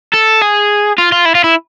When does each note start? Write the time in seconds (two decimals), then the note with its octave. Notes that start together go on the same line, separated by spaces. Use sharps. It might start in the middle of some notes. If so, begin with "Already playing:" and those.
0.13 A4
0.41 G#4
0.98 F4
1.12 F4
1.25 E4
1.35 F4
1.44 E4